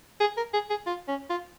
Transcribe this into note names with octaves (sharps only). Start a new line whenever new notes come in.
G#4
A#4
G#4
G#4
F4
C#4
F4